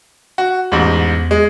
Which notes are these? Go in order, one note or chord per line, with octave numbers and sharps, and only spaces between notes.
F#4
A1 E2 G#2
G#3